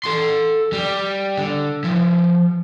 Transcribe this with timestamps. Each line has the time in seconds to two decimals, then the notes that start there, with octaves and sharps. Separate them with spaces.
0.04 A4 C6
0.73 G3
1.37 D3
1.84 F3 E4